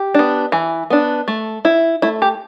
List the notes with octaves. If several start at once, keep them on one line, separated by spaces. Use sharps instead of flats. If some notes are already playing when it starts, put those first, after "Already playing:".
Already playing: G4
B3 D4
E3
B3 D4
A3
E4
A3 E4
G4